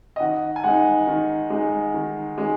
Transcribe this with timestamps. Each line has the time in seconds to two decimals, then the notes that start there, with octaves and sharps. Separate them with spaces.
0.16 D#5
0.20 D#3 F#5
0.56 G#5
0.64 G#3 D#4 F#5
1.07 D#3
1.50 G#3 D#4
1.94 D#3
2.38 G#3 D#4